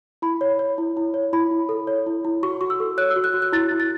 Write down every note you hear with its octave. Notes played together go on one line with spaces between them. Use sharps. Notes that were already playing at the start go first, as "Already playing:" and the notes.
E4 B5
C#5
C#5
E4
E4
C#5
E4 B5
E4
A4
C#5
E4
E4
F#4 C#6
F#4 C#6
E6
A4
C#5 F#6
E6
F#4
F#6
F#4
F#6
E4 A6
E4
A6